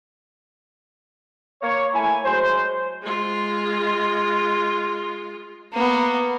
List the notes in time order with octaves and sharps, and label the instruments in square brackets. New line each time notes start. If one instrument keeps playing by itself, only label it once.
[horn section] A#3 C#5
A3 E4 G#5
F#3 G#3 C5
[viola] G#3 F4
[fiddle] A#3 B3